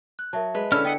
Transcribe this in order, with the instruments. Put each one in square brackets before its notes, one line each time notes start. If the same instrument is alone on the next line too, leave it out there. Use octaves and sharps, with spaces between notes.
[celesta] F#6
[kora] F#3 [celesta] A#4 E5 A5
[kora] G#3 B4
[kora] D3 E4 [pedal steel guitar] C#4 A4 F6 [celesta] B5
[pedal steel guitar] B3 D#5 F#5 [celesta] G5 B6 C#7